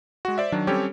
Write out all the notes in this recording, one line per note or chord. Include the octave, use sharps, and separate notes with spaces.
G#3 F#4
C5 D5 E5
D#3 F#3 D4
G3 C4 C#4 G4 A4 C#5